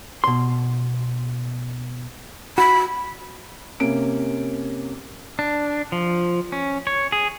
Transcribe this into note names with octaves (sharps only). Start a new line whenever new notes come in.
B2 C6
F#4 B5
C3 A#3 C#4 D7
D4
F3
C#4
C#5
G#4